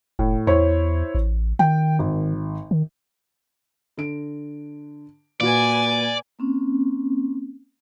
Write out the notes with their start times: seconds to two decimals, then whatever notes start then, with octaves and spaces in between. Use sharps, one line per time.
0.19 F1 A2
0.47 E2 E4 C5 C#5
1.15 A1
1.59 D#3 G5
1.99 G#1
2.71 D#3
3.97 D3 D7
5.41 A#2 F#4 B4 D5 G#5
6.39 A#3 C4 C#4